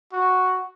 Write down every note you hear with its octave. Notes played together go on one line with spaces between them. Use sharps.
F#4